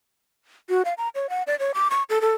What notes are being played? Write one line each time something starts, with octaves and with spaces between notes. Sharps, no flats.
F#4
F5
A#5
C#5
F#5
D5
C#5
D6
C#6
A4
A4